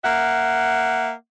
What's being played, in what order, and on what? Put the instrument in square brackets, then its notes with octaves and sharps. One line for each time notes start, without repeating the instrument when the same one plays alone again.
[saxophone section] A#3 E5 F#5